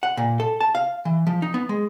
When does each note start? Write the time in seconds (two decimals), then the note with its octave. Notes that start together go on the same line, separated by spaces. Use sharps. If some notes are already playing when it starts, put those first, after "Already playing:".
0.03 F#5
0.17 A#2
0.40 A4
0.61 A5
0.75 F5
1.05 E3
1.27 F3
1.42 D#4
1.54 B3
1.69 G#3